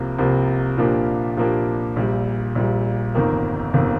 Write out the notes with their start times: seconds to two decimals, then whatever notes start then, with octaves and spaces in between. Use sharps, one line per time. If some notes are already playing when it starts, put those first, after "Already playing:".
Already playing: C2 C3 F3 A#3
0.19 C2 C3 F3 A#3
0.78 A#2 F3 A#3 D4 G4
1.37 A#2 F3 A#3 D4 G4
1.96 A#1 A#2 G3
2.55 A#1 A#2 G3
3.15 G1 F2 D#3 A#3
3.73 G1 F2 D#3 A#3